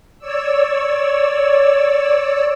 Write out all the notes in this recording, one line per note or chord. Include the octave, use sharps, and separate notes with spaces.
C#5 D5 E6